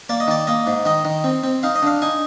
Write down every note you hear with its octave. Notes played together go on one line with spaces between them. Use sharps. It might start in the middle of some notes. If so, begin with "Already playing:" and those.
A#3 D5
D#5
D#3 D5
A#3 D#5
G#2
D#3 D#5
D#3
C4
C4
D#4 F5
D#5
D3 F5
D#4 G#5